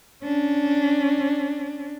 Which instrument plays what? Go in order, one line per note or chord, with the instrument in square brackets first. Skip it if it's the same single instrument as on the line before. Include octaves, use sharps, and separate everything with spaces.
[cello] C#4 D4